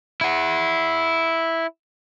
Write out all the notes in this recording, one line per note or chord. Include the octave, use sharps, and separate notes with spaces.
E4 F#5